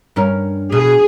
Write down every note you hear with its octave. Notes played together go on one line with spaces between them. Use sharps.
G2 C#4 A#4
B2 G#4